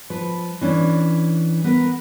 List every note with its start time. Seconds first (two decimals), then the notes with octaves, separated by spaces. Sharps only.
0.10 F3 B4
0.61 E3 C#4 D4
1.64 B3 A#4 B4